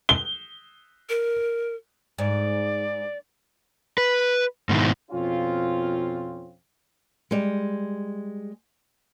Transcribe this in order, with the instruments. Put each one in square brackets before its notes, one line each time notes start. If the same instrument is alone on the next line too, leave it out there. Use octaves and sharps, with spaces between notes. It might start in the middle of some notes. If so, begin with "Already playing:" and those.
[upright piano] G7
[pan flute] A#4
[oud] G#2 [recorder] D5
[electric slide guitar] B4
G#2 B2 D#3 E4
[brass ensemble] F2 B2 C4 C#4 F4
[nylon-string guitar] G3 G#3